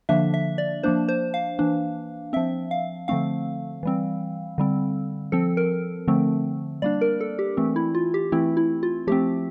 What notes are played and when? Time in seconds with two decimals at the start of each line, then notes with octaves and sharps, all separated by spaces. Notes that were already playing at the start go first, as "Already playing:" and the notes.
0.09 D3 F3 A#3 D4 E5
0.34 E5
0.58 D5
0.83 F3 A#3 D4 C5
1.09 C5
1.34 F5
1.59 E3 A#3 D4
2.33 F3 C4 E5
2.71 F5
3.08 D3 F3 A3 C4 F5
3.83 E3 G3 C4
4.58 D3 G3 C4
5.32 F3 C4 A4
5.57 A#4
6.07 D3 F3 A3 C4
6.82 G3 A#3 D4 D5
7.01 A#4
7.21 A4
7.39 G4
7.57 E3 A3 C4
7.76 E4
7.95 F4
8.14 G4
8.32 E3 A3 C4 E4
8.57 E4
8.83 F4
9.07 F3 A3 C4 G4